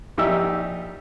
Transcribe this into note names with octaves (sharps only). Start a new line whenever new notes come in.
A#1 D#4 G4 E5 E6